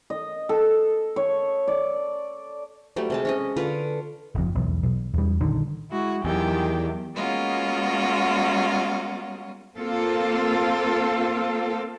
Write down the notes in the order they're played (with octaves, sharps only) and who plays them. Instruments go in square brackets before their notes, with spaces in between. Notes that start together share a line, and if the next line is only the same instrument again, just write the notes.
[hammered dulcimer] D#5
A4
C#5
D5
[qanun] F#3 G3 A3 D4
C3 G#3 A5
C#4 C#5 D#5
D3 F4 B4
[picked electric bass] F#1 F2
B1 E2
B1
E2 G3
A#1 D3 D#3
[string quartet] G#3 E4 F#4
[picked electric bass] E2 [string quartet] D#3 F#3 G4
[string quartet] G#3 A#3 B3 C#4 F4 F#4
[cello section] A#3 C4 F4 A4